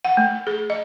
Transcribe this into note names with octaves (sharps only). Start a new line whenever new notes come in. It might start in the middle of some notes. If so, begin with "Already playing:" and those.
F#5
A3
G#4
D#5